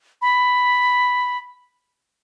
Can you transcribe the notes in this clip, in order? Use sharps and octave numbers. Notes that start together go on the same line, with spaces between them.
B5